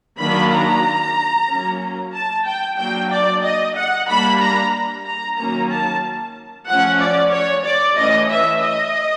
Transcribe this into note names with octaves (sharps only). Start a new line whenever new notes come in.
D#3 F#3 A#3 D4 B5
A#5
F#3 A#3 C#4
A5
G5
F#3 A#3 D4 G5
D5
D#5
F#5
G3 A#3 D4 B5
A#5
A#5
D#3 F#3 A#3 C#4 A#5
A5
F3 A3 C#4 F#5
D5
C#5
D5
E3 A3 C#4 D#5
E5
D#5